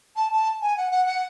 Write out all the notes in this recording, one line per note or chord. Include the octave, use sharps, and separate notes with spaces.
A5
A5
G#5
F#5
F#5
F#5